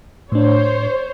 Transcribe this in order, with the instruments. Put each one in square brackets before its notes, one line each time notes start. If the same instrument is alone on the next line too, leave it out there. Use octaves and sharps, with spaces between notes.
[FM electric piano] A2 D4 [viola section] C5 C#5